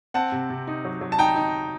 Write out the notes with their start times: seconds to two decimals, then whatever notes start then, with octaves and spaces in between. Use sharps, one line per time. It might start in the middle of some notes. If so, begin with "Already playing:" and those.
0.14 C4 F#5 A5
0.32 C3
0.50 C3
0.67 D#4
0.85 F#3
1.01 F#3
1.12 A5
1.19 D#4 G5 A#5
1.36 D#4